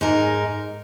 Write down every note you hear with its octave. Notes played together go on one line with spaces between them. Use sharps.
G#2 G#3 D#4 A#4